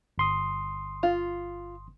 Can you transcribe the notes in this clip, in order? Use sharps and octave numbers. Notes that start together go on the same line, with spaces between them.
G1 C6 D#6
F4